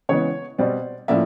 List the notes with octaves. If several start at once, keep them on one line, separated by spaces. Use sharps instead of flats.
C#3 E3 G#3 B3 C#5
B2 G3 C4 C5 D5
A2 F3 A#3 C#4 D5 E5